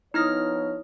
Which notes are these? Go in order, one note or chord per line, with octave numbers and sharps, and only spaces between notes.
F3 B3 D#4 E4 C#5 D#6 F6 A#6